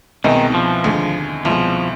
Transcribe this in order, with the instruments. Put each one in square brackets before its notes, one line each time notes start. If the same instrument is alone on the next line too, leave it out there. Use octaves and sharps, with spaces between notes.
[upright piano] C2 B2 G#3 C4 D#4 [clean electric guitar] D#3
[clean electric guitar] F3
[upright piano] D#2 D3 G#3
[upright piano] C2 B2 G#3 [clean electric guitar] F3